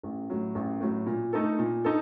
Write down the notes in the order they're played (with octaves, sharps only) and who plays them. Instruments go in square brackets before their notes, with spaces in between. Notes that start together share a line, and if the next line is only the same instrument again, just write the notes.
[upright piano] A1
A2 F#3
A1
A2 F#3
A#2
A3 D#4 A4
A#2
D#4 A4